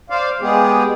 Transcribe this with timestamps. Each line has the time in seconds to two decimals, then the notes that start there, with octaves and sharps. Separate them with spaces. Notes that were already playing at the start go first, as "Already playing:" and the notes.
0.10 C5 D5 F5
0.41 G#3 B3 G4 G#4